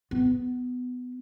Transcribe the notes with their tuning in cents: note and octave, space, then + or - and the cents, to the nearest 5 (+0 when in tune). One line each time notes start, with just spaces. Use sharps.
B3 +15